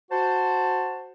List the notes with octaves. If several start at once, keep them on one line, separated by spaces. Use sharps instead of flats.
F#4 C5 A5